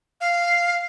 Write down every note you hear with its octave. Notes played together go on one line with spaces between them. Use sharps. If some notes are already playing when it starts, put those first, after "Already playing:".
F5